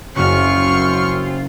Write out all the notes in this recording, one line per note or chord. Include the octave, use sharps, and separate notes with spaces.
F#1 F#2 C#3 C4 F4 C#6 F6